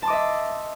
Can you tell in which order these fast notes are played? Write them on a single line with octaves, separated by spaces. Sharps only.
A5 C6 D6 D#5 E5